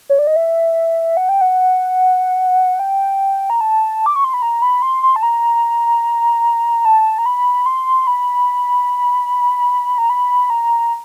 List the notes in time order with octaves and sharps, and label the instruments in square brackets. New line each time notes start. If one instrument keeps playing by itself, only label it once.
[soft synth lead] C#5
D5
D#5
E5
F#5
G5
F#5
G5
A#5
A5
D6
C#6
C6
B5
A#5
B5
C6
C6
A5
A#5
A5
A#5
B5
C6
B5
A#5
B5
A#5